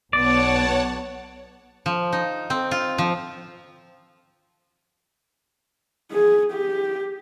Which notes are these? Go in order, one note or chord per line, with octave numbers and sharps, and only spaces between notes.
B1 B3 C#5 D5 F#5 A5
F3
D#4
C4
F4
F3
G#4
G4